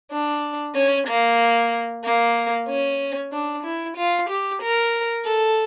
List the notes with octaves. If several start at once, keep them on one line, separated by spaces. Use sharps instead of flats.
D4
C#4
A#3
A#3
C#4
D4
E4
F4
G4
A#4
A4